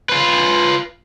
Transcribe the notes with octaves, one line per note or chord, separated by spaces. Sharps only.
F4 B4